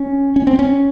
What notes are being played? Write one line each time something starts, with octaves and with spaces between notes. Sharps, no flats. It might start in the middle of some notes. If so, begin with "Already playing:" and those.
Already playing: C#4
C#4
C4
C#4